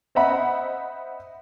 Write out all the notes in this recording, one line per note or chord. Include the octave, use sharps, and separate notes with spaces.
C5 D#5 E5 F#5 B5